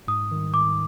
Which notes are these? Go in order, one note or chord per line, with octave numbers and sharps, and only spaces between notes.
G#2 D#6
D#3 G3
G#2 D6